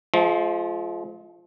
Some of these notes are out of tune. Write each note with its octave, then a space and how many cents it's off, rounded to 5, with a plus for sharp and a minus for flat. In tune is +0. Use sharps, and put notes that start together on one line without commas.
F3 -5 G#3 +40